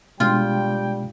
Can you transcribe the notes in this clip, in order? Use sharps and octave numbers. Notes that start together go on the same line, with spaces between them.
B2 G3 G#3 D4 F4 G5